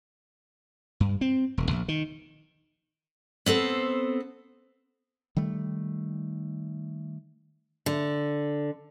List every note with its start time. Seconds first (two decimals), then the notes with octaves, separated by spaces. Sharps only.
1.00 G2
1.21 C4
1.58 E1
1.71 A#1
1.88 D#3
3.46 B3 C4 A4 C5
5.37 D#3 G3 A3
7.86 D3